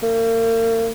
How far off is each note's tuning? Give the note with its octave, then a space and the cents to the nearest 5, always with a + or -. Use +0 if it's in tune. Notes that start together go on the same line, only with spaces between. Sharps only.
A#3 -40